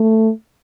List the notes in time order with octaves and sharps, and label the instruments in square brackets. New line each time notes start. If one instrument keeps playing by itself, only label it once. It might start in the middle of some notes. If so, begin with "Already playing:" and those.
Already playing: [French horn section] A3